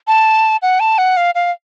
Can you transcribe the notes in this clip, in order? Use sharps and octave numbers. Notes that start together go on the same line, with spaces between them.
A5
F#5
A5
F#5
F5
F5